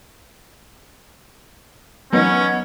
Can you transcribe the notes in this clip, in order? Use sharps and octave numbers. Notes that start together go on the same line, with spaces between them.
F#3 B3 C#4 D#4